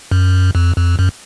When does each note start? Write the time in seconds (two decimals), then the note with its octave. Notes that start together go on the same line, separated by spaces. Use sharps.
0.12 F#2
0.55 F2
0.77 F2
0.99 F#2